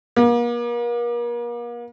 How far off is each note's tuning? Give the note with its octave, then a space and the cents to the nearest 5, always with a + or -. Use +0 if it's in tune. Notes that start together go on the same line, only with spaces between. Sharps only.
A#3 +40